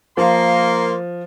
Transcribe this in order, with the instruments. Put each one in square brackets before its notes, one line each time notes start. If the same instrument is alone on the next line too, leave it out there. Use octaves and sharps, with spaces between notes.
[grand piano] F3 [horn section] A#3 C6